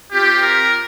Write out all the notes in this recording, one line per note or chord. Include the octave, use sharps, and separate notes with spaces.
C4 F4 G4
A#4